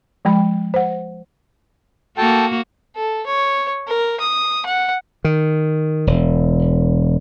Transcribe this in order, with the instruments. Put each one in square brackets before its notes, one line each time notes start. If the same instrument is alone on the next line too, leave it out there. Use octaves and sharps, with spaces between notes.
[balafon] F3 G#3 G5 B5
C5 F#5
[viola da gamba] A#3 F#4 [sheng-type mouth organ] A4 G5 A5
[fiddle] A4
C#5
A#4
D#6
F#5
[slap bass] D#3
E1